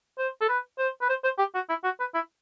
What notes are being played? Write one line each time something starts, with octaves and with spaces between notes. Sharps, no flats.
C5
A4
B4
C5
B4
C5
C5
G4
F#4
E4
F#4
B4
E4